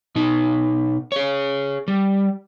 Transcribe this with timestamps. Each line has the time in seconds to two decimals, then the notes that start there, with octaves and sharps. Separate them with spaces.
0.16 B2 D#4
1.12 G#4 C#5
1.88 G3